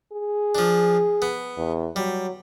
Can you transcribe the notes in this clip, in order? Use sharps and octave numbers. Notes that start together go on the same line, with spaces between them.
G#4
F3 D4
B3
E2
F#3 G3